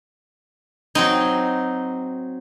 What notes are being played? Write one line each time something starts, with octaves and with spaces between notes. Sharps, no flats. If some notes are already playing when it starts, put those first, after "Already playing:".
F#3 C4 D#4